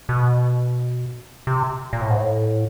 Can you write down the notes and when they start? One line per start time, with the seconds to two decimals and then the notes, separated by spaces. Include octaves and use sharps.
0.09 B2
1.47 C3
1.93 A#2
2.01 A2
2.10 G#2
2.18 A2